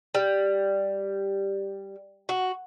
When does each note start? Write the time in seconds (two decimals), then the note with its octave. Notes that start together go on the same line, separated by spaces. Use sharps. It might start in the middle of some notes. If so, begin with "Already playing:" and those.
0.15 G3
2.29 F#4